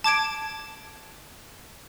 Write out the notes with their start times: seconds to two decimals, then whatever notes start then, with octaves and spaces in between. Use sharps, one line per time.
0.04 A5 D6 G#6 D7